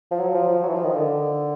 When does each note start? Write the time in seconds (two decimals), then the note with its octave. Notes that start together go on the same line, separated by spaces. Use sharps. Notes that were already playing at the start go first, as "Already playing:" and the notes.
0.11 F3
0.19 F#3
0.35 F3
0.48 F3
0.63 F#3
0.68 E3
0.74 F3
0.84 D#3
0.94 D3